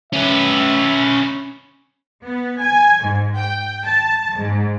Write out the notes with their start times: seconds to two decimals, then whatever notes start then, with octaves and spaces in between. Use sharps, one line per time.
0.13 C#4 B4 E5
2.25 B3
2.61 G#5
3.03 G#2
3.37 G5
3.85 A5
4.38 G#2